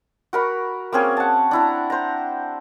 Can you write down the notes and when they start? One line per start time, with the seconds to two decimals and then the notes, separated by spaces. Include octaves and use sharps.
0.33 F#4 A#4 B5
0.93 A#3 C4 C#4 G#4
1.17 F#5 A5
1.51 D4 E4 A#5
1.90 C5 A#5